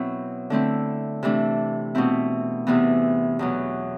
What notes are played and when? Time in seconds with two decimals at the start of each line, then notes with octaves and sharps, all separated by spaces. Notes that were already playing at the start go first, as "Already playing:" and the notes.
Already playing: B2 F#3 C4 E4
0.50 D3 A3 C4 E4
1.23 C3 E3 A3 D4
1.95 B2 A3 C4 E4
2.67 E2 C3 E3 B3
3.39 E2 B2 F#3